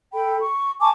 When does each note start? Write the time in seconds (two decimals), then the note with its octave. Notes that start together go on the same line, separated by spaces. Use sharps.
0.13 A4 G5 B5
0.40 C#6
0.80 G#5 A5 C#6 D6